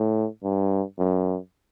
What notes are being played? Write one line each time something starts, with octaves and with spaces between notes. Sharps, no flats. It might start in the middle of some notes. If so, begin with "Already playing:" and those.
Already playing: A2
G2
F#2